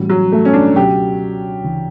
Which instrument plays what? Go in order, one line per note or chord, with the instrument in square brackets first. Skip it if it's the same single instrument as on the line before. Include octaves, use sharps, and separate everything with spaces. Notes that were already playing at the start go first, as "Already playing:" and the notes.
Already playing: [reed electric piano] A2 E3 G3 C#4 F#4
[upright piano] F#3
A3
C#4
D4
[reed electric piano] C#2 B2 F#3 C#4 F#4 [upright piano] G4
[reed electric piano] D2 C#3 E3